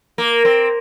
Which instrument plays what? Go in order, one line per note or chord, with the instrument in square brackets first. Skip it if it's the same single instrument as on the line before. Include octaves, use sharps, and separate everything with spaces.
[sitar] A#3
C4